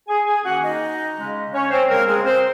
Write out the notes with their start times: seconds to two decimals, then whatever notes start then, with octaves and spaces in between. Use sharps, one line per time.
0.08 G#4 G#5
0.27 G#4 G#5
0.45 D#3 A#3 C#4 F#4 F#5
0.63 D#4 D#5
1.17 C#3 G#3 C#4
1.53 C#4 C#5
1.71 C4 C5
1.89 C#3 G#3 A#3 C4 A#4
2.07 G#3 G#4
2.25 C4 C5